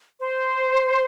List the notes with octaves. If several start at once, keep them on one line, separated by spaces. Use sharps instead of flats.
C5